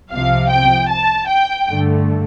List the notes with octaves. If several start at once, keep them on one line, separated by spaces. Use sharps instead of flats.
C2 C3 F3 F5
G5
A5
G5
G2 D3 A3